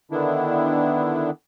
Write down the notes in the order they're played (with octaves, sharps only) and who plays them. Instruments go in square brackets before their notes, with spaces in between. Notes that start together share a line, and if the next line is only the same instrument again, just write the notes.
[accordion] D3 D#3 B3 D4 E4